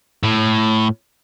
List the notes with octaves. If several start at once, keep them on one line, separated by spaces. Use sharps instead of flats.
A2